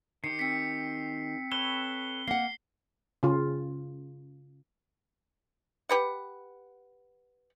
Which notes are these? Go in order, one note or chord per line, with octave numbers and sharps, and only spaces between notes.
D#3 G4 C7 C#7
C4 B6 C#7
A4 B4 C#5 G7
A#3 F#5 C7
C#3 F4
G4 B4 F#5